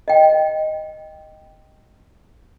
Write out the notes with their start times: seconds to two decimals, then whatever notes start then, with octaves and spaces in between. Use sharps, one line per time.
0.08 D#5 G5